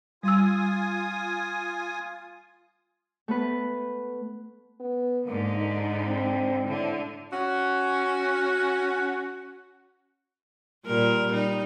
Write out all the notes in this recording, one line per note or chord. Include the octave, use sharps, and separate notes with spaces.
G3 F4 G#5 D#6 E6
A3 B3 B4
B3
G#2 D3 A#3
D#4
C4
A2 D3
C#4 F#4
A#2 G3 A#4
G3 D#4